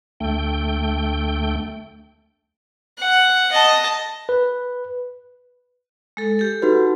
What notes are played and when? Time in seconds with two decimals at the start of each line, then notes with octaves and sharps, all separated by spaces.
0.20 D2 A3 G5
2.99 F#5
3.52 D#5 A5
4.29 B4
6.17 G#3 A4
6.39 G4 A4
6.62 D#4 F#4 B4